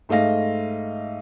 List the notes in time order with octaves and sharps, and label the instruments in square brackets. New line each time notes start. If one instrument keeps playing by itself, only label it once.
[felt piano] G#2 A3 D#5 F5 A#6